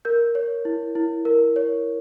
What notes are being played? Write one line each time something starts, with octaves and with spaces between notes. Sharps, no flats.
A#4 G6
C#5
E4
E4
A#4
C#5